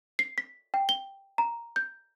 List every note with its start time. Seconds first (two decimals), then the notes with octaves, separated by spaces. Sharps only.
0.19 C7
0.38 B6
0.74 G5
0.89 G7
1.38 A#5
1.76 G6